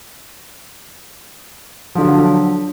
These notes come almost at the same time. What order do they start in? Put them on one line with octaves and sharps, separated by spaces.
F3 D3 F#3